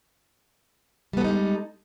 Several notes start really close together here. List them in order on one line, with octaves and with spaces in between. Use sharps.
G3 B3 A4 D#4 G#3